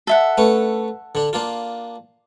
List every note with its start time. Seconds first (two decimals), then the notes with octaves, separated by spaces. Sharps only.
0.07 A4 E5 F#5
0.38 A3 C#4 B4
1.15 D3 D4
1.33 A#3 D4 F4